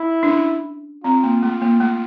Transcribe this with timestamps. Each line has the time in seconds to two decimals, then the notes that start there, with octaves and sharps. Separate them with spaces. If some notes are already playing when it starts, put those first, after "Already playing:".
Already playing: E4
0.23 D4
0.29 C#4
1.04 C4 F4
1.24 A#3
1.43 A3
1.62 A#3
1.80 A3